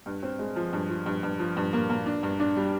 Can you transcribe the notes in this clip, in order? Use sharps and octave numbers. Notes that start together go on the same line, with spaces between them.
G2
C4
G#3
F3
G2
F3
G2
G2
F3
G2
A#3
A#3
D4
G2
D4
G3